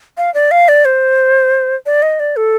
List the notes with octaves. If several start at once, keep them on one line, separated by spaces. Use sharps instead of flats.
F5
D5
F5
D5
C5
D5
D#5
D5
A4